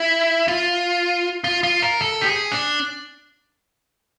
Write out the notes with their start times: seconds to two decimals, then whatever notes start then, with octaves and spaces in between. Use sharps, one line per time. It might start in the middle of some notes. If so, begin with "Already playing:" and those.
Already playing: E4
0.48 F4
1.44 F4
1.63 F4
1.82 A#4
2.01 A4
2.21 G4
2.27 G#4
2.52 D4